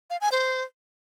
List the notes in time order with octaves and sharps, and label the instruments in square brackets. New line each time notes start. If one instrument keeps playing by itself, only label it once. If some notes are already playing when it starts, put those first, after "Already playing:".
[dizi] F5
G#5
C5